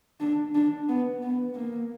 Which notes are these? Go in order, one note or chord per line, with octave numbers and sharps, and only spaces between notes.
D4
D4
B3
B3
A#3